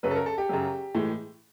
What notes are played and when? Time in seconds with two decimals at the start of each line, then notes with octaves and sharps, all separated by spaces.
0.03 F#2 C#3 F#3 B4
0.11 A4
0.16 A#4
0.26 A4
0.38 G4
0.49 F#2 C#3 F#3
0.95 A2 E3 G#3